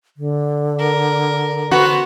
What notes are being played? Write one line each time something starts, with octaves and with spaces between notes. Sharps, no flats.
D3
A#4
B3 F#4 C5